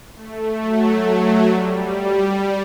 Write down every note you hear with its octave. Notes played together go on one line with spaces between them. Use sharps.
A3
F#3
G3